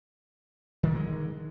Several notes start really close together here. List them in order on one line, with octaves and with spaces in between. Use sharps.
D#3 G3 D3 G#3